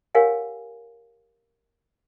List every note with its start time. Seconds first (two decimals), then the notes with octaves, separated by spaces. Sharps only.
0.15 G4 A#4 C#5 F5 F#5 G#5